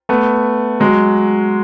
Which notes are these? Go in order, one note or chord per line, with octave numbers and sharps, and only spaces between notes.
A3 B3
F#3 G#3